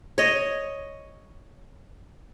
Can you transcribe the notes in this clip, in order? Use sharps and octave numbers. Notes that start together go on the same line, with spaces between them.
C#5 D#5